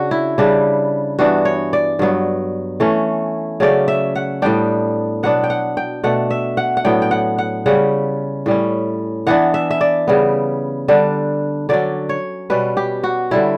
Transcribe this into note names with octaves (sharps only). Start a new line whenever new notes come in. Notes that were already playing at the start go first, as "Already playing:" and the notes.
Already playing: C#3 D4 F#4
E4
C#3 G3 D4
G2 E3 B3 D4 F#4
C#5
D5
G2 F#3 B3
E3 A3 C#4
C#3 F#3 A3 C#4 D5
E5
F#5
A2 G3 B3 D4 G5
B2 F#3 B3 D4 F#5
G5
F#5
G5
B2 A3 D4 F#5
E5
F#5
F#5
A2 F#3 B3 D4 G5
G5
F#5
F#5
C#3 G3 C#4 F#5
A2 G3 C#4
E3 B3 D4 F#5
E5
E5
D5
C#3 G3 B3
D3 G3 D4
D3 F#3 C#4 D5
C#5
B2 G3 C#4 B4
G4
F#4
D3 G3 C#4 E4